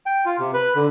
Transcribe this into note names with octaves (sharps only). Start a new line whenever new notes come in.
G5
F4
C3
B4
D3